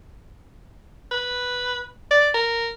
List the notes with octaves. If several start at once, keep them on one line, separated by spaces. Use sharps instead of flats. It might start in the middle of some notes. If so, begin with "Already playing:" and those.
B4
D5
A#4